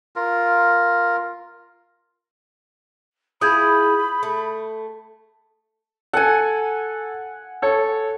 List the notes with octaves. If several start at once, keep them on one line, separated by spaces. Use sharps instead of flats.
F4 A#4
E4 F4 G#4 B5 D#6 G6 G#6
A3
A4 F#5 G#5
A4 C#5